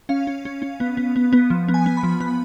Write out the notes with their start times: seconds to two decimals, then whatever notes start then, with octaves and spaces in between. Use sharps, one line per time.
0.09 C#4 F5
0.27 C#4
0.45 C#4
0.62 C#4
0.80 B3
0.97 B3
1.16 B3
1.33 B3
1.50 F3
1.68 B3
1.74 G#5
1.86 B3
1.97 B5
2.03 F3
2.20 B3 B5